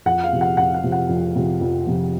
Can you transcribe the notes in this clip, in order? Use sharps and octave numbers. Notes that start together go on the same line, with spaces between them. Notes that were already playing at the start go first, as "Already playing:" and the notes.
F2 F#5
F5
C3 F3
F#5
F2 F#5
F#5
C3 F3
F#5
F2
C3 F3
F2
C3 F3